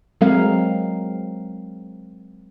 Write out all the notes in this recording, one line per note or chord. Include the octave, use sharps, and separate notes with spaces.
F#3 G#3 C4 A#4 F5